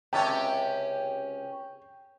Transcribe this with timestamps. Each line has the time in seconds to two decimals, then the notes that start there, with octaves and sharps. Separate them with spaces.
0.13 C#2 C3 C#4 G4 C#5 G5 A5